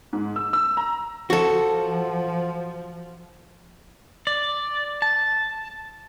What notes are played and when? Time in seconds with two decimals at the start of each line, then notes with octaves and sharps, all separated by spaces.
0.13 G#2
0.36 E6
0.53 E6
0.77 A#5
1.30 F3 F#4 A4
4.27 D5
5.02 A5